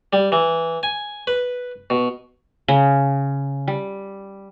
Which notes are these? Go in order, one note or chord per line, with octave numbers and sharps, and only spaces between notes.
G3
E3
G#5
B4
B2
C#3
G3